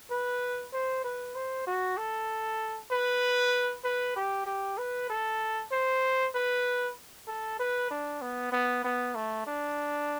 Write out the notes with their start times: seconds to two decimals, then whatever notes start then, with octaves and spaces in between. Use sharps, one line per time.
0.11 B4
0.73 C5
1.04 B4
1.35 C5
1.67 F#4
1.97 A4
2.91 B4
3.84 B4
4.16 G4
4.46 G4
4.78 B4
5.10 A4
5.72 C5
6.35 B4
7.27 A4
7.59 B4
7.91 D4
8.21 B3
8.52 B3
8.84 B3
9.15 A3
9.47 D4